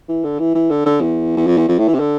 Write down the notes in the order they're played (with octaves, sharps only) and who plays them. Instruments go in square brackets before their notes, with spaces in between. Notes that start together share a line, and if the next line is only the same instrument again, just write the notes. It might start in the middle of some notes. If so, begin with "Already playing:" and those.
[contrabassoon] E3
D3
E3
E3
D3
D3
E2
E2
F2
E2
F2
A2
E3
C3
D3